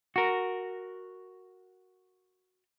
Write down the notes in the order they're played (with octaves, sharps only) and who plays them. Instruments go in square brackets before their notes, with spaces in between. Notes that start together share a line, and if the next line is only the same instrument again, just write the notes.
[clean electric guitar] F#4 A#4